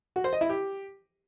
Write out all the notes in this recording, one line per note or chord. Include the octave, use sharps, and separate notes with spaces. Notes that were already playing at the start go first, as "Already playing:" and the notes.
F#4
C5
D#5
E4
G4